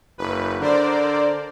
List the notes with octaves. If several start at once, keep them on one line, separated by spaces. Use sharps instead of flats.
F#1 B4
D3 A#4 C5 D5